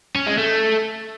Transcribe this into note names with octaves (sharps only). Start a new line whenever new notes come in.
C#4
G#3
A3